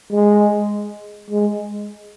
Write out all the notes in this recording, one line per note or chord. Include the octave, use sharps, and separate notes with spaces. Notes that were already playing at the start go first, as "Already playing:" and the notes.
G#3
G#3